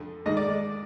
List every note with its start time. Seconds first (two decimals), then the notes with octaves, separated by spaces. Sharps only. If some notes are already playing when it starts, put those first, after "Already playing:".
Already playing: F2 D3
0.26 G#2 D#3 D#5
0.37 D5